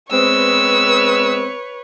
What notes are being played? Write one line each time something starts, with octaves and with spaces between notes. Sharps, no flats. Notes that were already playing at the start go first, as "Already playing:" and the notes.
G#3 B3 C4 B4 C#5 E6